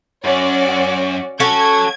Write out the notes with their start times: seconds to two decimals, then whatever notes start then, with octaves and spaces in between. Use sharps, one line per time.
0.25 F#2 C#4 F#4 D5
1.40 C#4 F#4 A4 C#5 F#5 G#6